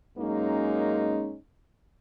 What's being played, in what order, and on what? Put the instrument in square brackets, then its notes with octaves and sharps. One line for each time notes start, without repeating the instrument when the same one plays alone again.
[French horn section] F#2 G#3 A#3 C#4 D#4